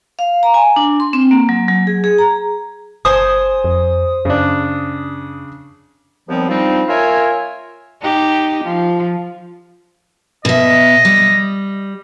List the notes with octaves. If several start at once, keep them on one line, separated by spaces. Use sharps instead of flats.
F5
A#5
G#5
D4
C6
C4
A#3
F#3
F#3
G#4
G#4
A#5
F#1 C5 G#5 D#6
F2
F#2 C#3 D4
D#2 F3 G3 B3 C4
F3 G3 C4 D4 D#4
F4 A#4 C#5 E5 G#5
D#4 G4
F3
B2 D#5 E5
G3